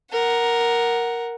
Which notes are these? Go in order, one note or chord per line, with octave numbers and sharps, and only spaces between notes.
A#4 F#5